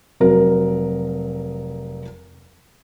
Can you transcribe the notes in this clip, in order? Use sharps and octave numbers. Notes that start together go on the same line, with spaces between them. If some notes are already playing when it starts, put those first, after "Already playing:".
F1 F#3 A#4